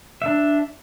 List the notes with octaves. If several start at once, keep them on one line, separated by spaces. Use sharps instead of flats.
D4 E5